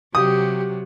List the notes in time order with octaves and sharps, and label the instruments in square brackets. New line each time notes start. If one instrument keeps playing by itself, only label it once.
[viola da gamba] C3 F#3 [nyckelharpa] G4 [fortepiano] D#6